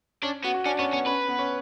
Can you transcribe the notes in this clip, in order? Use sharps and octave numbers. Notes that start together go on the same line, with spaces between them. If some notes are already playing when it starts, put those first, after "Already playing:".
C#4 D4
B3 F#4
F#4
C#4 D4
B3 C#4
B3 C#4
C#4 B4
B3
C#4